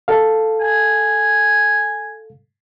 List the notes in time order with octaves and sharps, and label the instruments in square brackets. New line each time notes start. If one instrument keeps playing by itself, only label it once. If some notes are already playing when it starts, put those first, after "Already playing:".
[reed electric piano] A4 F5
[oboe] G#5